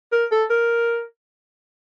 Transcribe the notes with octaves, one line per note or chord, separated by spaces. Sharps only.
A#4
A4
A#4